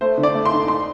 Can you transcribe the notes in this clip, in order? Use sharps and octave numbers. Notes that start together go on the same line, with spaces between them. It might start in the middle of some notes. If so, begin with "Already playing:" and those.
A3 C5
D3
D5
A3
C6
D#4
C6